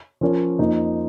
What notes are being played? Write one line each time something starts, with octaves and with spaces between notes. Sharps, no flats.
F3 C#4 A#4 C#5
F2 F3 A#3 D#4